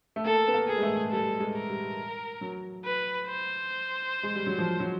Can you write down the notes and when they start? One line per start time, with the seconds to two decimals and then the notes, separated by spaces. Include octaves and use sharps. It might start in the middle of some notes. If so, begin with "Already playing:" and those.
0.16 A3
0.25 A#3 A4
0.48 B3
0.54 A#3
0.68 G#4
0.78 G#3
0.83 A3
1.11 G3 A4
1.40 G#3
1.55 A#4
1.69 G3
2.41 F#3
2.85 B4
3.28 C5
4.23 G#3
4.35 G3
4.47 F#3
4.59 F3
4.80 F#3